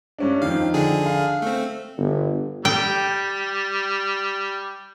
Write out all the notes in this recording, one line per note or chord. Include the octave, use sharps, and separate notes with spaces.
G2 C#4 D4
F2 D#3 F5
D3 D4 G#4
F5
A3 C4
G1
G3 G5